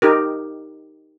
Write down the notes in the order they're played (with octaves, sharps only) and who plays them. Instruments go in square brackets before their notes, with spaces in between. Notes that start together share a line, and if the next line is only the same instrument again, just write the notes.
[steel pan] D#4 G4 A#4